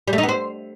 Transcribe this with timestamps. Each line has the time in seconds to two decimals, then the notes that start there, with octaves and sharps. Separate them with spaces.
0.08 G3
0.13 A3
0.18 D#4
0.23 B3
0.29 C5